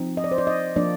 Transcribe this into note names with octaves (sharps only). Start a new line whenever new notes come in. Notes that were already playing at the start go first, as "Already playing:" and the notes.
Already playing: F3 C4 D#4
D#5
D5
C5
D5
D#5
F3 A#3 D4 D5